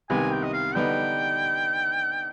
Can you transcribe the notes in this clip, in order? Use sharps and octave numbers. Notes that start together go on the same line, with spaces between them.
C2 C3 D#3 B3 G#5
G5
D#5
F5
D3 G3 B3 D#4 G5